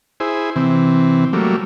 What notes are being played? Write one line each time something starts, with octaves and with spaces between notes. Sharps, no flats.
E4 G#4 C5
C3 E3 C4
F#3 G3 A3 A#3